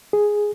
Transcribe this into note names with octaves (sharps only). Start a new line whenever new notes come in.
G#4